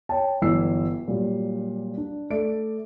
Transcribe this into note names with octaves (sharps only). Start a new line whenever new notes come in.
C#5 G5 A5
G1 E3 F#3 E6 C7
A#2 F#3 G3
D4
A3 D5 D7